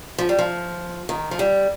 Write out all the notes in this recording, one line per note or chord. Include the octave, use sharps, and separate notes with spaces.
F3
G3
F3
D#3
F3
G3